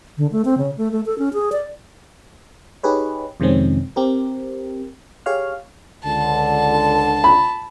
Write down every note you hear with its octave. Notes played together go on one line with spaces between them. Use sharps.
D3
A3
C4
C#3
A3
A3
A4
C#4
G#4
D5
D#4 G4 G#4 B4 C#5
F2 C3 D#3 G#3 C4 C#4
C4 G4 A#4
G4 G#4 C#5 F5 F6
C#2 D3 A5
B5